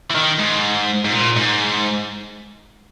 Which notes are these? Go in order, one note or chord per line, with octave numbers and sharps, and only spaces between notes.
E3
D#3
G#2
G#2
A#2
G#2